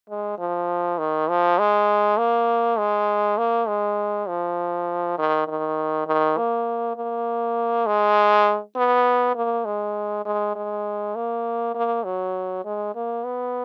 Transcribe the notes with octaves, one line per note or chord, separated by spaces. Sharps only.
G#3
F3
D#3
F3
G#3
A#3
G#3
A#3
G#3
F3
D#3
D#3
D#3
A#3
A#3
G#3
B3
A#3
G#3
G#3
G#3
A#3
A#3
F#3
G#3
A#3
B3